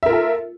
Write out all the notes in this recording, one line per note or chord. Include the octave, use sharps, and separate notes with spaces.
F4 A4 A#4 E5